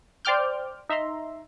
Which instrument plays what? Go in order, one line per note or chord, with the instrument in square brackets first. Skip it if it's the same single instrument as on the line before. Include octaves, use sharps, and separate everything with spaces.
[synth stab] C5 D5 G5 D6 F6 G6
D#4 E5 A#5 C6